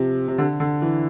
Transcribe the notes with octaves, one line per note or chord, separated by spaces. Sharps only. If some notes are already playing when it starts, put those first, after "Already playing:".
Already playing: C3 F3
C3
D3
D3
E3